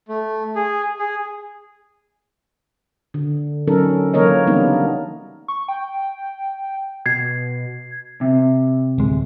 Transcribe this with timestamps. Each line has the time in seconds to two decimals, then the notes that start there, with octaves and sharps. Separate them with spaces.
0.08 A3
0.56 G#4
0.99 G#4
3.14 D3
3.67 F#3 C#4 D#4 A4 A#4
4.13 E3 F#3 A#3 A#4 C#5 D#5
4.47 C#3 G3 A#3 B3 D4 D#4
5.48 C#6
5.68 G5
7.06 B2 G#6 C7
8.21 C3
8.98 D1 G#3